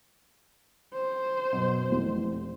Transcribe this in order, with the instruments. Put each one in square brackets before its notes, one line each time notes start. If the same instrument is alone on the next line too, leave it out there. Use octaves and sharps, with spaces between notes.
[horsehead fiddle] C5
[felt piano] F#2 B2 C4
F1 E3